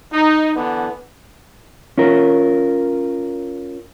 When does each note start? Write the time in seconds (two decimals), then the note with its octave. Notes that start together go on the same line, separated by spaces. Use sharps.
0.12 D#4
0.55 D3 E3 B3
1.98 C#4 F4 A#4